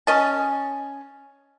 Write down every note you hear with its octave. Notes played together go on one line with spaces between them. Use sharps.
C#4 D#5 A5